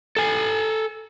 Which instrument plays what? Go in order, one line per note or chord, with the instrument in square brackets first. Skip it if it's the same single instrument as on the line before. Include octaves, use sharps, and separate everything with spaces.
[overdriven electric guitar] A4 G#5